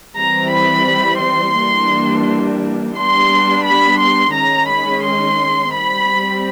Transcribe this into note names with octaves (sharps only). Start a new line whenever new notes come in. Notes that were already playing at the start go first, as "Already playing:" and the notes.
E3 G3 C4 A#5
B5
C6
E3 G3 A#3 D4
G3 B3 D4 C6
B5
C6
D#3 G#3 C#4 A#5
B5
C6
G3 C4 B5